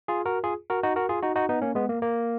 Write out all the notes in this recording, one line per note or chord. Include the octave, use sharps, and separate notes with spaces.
F4 G#4
F#4 A#4
F4 G#4
F#4 A#4
D#4 F#4
F#4 A#4
F4 G#4
D#4 F#4
D#4 F#4
B3 D#4
A#3 C#4
G#3 B3
A#3
A#3